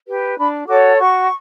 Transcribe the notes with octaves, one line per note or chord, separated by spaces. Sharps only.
G4 B4
D4 B5
F#4 A4 C#5 D6
F#4 C#6